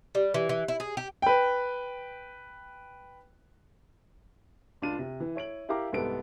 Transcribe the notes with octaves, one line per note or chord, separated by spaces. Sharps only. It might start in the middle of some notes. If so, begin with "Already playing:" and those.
G3
E3
E3
E4
G#4
G4
B4 G5
C#2 D4 F4 D#7
C3
E3
E4 C#5 D7 F#7
E4 G4 A#4 F5 A#5 D6
C2 G#2 C3 B3 A4 D7